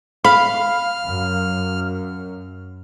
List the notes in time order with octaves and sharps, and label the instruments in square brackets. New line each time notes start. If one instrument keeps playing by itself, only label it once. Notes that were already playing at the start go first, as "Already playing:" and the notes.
[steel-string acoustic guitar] F5 [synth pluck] B5 [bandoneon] F6
[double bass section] F#2